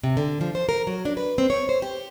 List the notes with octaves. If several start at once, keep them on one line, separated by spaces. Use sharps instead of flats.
C3
D3
F3
C5
A#4
F#3
D4
B4
C4
C#5
C5
G4